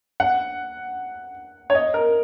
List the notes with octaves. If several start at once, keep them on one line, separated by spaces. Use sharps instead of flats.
F#5
C#5
D#5
A#4